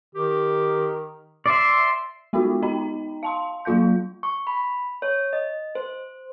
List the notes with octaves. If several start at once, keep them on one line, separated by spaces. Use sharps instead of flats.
D#3 G4
D5 E5 C6
G#3 B3 D#4 F4 F#4
D#4 D#5 G5 A#5
F5 A5 C6
F#3 A#3 F4 F5 G6
C#6
B5
C#5
D#5
C5